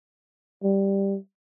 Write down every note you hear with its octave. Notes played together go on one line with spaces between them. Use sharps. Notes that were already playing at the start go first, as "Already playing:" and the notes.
G3